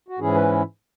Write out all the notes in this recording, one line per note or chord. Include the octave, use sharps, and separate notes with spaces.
F#4
G#2 E3 C#4 E4 G#4
B4